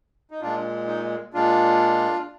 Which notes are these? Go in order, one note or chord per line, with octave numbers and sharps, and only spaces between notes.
D#4
A#2 G#3 D4 F4
D#4
A#2 G#3 D4 F4